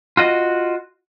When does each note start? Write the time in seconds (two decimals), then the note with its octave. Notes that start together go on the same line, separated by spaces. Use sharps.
0.17 F4 F#4 D#5